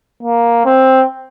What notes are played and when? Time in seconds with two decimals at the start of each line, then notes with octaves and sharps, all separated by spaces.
0.23 A#3
0.65 C4